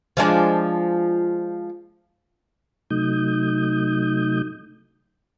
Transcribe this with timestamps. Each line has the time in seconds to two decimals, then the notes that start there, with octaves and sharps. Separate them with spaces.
0.17 F3 G#3 D4
2.90 C3 F#3 A3 D#4 D#6 G6